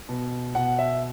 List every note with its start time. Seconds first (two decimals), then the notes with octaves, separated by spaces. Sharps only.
0.09 B2
0.55 B2 F#5
0.79 E5